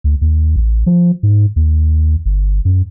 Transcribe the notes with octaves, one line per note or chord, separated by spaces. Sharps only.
D2
D#2
A1
F3
G#2
D#2
G1
F#2